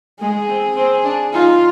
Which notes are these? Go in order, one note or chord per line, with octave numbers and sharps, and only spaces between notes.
G#3 G#4
C4
C4
D4
D#4 F4